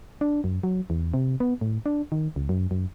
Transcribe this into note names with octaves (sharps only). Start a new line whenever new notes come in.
D4
F#2
F#3
E2
C3
B3
A2
D4
D#3
C#2
F#2
F#2